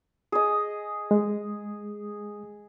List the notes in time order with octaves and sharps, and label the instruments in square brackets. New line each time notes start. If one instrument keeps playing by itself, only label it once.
[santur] G#4 D#5
[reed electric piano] G#3